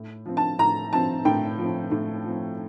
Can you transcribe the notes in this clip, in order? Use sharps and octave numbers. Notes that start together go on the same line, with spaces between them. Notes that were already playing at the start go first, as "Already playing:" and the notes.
Already playing: A2
F3 C4
A5
A2 A#5
F3 C4 A5
A2 G5
F3 C4
A2
F3 C4